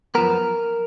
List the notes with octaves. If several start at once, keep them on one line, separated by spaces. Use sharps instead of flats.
F#2 F3 B3 A#4